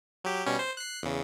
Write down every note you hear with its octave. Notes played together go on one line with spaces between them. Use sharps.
F#3 G4
B2 G3 C#4
C5
F#6 C7
E2 C#3